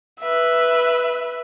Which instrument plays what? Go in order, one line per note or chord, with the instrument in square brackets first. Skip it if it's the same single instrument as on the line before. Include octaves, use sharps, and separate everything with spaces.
[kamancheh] B4 E5